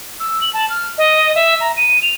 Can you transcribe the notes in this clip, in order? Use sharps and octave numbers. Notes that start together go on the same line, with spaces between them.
E6
F#7
A5
F6
D#5
E5
A#5
D#7
F7